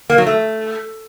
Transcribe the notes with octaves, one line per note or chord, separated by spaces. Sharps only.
A#3
F#3
A3